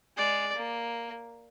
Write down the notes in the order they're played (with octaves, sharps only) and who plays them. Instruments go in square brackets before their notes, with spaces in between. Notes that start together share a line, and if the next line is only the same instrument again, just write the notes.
[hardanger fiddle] G#3 [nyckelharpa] D5
[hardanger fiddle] A#3